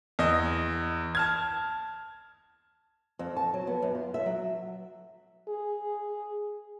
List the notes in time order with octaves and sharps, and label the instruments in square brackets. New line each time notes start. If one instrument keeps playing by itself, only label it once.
[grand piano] E2 D#5
A5 F6 G#6
[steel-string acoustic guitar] F2
A5
F#3
B3
F#2
F4
E5
F#3
[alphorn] G#4